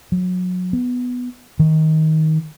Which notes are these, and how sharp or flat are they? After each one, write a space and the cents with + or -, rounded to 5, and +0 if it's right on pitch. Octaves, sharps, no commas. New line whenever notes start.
F#3 -25
B3 +5
D#3 +15